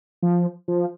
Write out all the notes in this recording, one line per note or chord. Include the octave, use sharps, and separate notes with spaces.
F3
F3